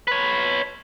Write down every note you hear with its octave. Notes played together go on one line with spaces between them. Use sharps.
B4 C#5